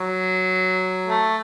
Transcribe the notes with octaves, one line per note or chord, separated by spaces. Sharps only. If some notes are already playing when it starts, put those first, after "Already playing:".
Already playing: F#3
A3